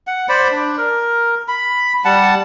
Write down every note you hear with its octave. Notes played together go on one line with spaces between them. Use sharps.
F#5
C5 D5 B5
D4
A#4
B5
G3 F#5 A5